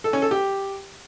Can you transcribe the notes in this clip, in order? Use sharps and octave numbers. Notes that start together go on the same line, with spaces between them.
A4
C#4
A4
G4